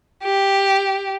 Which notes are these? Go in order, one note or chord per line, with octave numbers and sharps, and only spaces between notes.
G4